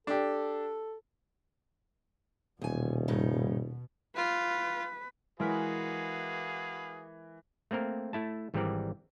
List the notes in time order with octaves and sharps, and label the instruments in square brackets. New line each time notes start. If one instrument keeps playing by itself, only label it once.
[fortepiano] D4 G4 [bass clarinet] A4
[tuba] D#1 [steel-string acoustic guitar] E2 G#5 [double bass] B2
[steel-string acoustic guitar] G2 C#3 D#4
[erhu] F4 [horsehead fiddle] B4
[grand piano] E3 [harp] G#3 A#4 B6 [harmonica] F#4 B4 F5 [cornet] G#4
[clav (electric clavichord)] A3 A#3 C4 A#4
A3 E4 A5
G#1 E3 G3 C4 A#4 D5